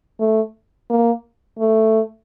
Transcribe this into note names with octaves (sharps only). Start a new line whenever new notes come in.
A3
A#3
A3